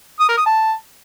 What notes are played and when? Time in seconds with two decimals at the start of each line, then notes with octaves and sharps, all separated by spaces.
0.20 D#6
0.29 A#4
0.37 D#6
0.46 A5